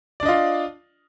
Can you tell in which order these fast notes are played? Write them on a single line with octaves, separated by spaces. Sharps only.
D5 D4 D#5 F4